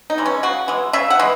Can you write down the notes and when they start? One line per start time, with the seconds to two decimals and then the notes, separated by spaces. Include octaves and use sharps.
0.10 D#4
0.18 E3 G#3
0.26 C#4
0.43 C#3 F#4
0.68 E3 G#3
0.93 C#3 E5
1.10 F#5
1.19 E3 G#3